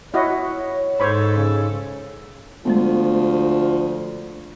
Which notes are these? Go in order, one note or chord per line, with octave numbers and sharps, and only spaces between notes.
E4 F#4 C#5 D#5
G#2 A4 C5 C#5 B5
C#3
D2 F3 G#3 A3 B3